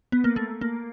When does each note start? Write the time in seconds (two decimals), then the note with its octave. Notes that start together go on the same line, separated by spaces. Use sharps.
0.12 B3
0.24 A#3
0.36 A3
0.61 A#3